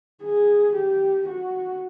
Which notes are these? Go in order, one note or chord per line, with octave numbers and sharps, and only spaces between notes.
G#4
G4
F#4